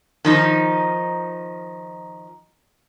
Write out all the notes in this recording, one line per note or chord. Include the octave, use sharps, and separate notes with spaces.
D#3 F3 D#4